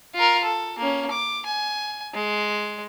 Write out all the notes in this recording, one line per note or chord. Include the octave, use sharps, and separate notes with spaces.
F4 A#4
A4
A#3 C#4
D6
G#5
G#3